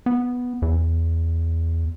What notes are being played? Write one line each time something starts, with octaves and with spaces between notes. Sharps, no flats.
B3
E2